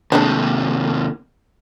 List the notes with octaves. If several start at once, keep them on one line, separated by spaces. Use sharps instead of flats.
D#2 C3 G#3 A3 D4